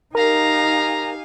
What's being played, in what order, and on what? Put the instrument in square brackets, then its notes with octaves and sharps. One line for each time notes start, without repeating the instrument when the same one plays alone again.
[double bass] D#4 [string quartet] G4 F5 G#5 [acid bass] A#4 [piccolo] A#5